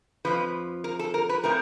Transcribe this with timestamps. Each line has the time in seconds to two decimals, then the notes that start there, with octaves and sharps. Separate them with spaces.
0.25 C#3 F3 B4
0.29 F2
0.84 A#4
0.99 A4
1.14 A#4
1.29 B4
1.44 A2 F3 A3 C4 A#4